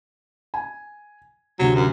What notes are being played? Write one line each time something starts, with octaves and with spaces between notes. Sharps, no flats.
G#5
D2 C3 F#3
F#2